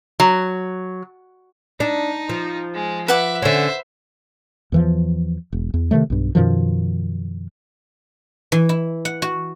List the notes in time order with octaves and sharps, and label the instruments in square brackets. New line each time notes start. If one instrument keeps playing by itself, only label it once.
[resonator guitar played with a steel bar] F#3
[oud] D4 [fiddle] D#4
[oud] F3
[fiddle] G#3
[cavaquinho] B4 F#5 D6 [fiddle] E5
[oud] D3 C#4 [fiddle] C5 E5
[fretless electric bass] E2 E3 F3
E1
E2
C3 D#3 F#3 A3
B1 G2
F#2 B2 D#3 F3
[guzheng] E3
E4
F#5
F#4